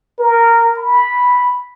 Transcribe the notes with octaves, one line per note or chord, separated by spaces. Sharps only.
A#4
B5